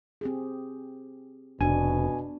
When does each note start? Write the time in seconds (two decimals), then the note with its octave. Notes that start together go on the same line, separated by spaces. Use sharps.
0.21 C4 G4 G#4
1.61 F1 B2 B3 D4 F#4 G#5